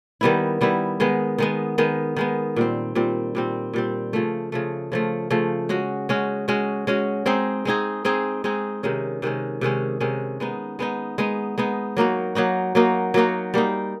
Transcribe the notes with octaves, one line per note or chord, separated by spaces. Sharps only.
D#3 G3 B3 E4
D#3 G3 B3 E4
D#3 G#3 B3
D#3 G#3 B3
D#3 G#3 B3
D#3 G#3 B3
A#2 G3 C4
A#2 G3 C4
A#2 G3 C4
A#2 G3 C4
C#3 F3 A3
C#3 F3 A3
C#3 F3 A3
C#3 F3 A3
G#3 C#4 F#4
G#3 C#4 F#4
G#3 C#4 F#4
G#3 C#4 F#4
G#3 C4 D#4 G#4
G#3 C4 D#4 G#4
G#3 C4 D#4 G#4
G#3 C4 D#4 G#4
C3 D#3 G#3 C#4
C3 D#3 G#3 C#4
C3 D#3 G#3 C#4
C3 D#3 G#3 C#4
G#3 B3 D#4
G#3 B3 D#4
G#3 B3 D#4
G#3 B3 D#4
F#3 A#3 D#4 F#4
F#3 A#3 D#4 F#4
F#3 A#3 D#4 F#4
F#3 A#3 D#4 F#4
G3 A#3 D#4